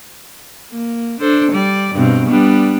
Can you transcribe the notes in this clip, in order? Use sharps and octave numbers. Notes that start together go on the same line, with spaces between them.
A#3
D4 A4 C5
G3 D5
G2 B2 C4
G3 B3 D4